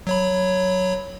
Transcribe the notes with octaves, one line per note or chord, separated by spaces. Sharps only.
F#3 C#5 B5